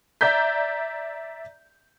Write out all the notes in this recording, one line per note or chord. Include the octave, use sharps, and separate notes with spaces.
D5 E5 A#5 G6 B6